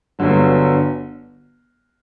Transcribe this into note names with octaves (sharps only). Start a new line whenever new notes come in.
G1 G2 D3 F#3